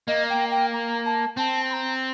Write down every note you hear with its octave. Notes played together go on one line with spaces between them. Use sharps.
A#3 D#5
G5
G5
A#5
A5
C4 A5
C6
A#5